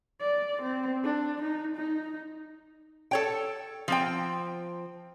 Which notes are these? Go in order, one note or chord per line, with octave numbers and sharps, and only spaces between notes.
D5
C4
D4
D#4
D#4
A4 C#5 G5
F3 C4 G5